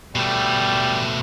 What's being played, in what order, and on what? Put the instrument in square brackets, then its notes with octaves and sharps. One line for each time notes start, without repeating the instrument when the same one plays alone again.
[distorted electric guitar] B2 A3 [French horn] G3